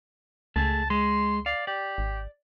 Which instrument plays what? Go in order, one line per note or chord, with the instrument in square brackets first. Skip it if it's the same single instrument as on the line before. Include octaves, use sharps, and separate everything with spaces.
[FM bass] C#2 [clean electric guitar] A3 G#4 [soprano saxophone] A5
[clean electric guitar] G#3 [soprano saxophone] C6
[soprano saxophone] D5 [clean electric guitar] F5
[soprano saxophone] G4 [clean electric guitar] D5
[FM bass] G#1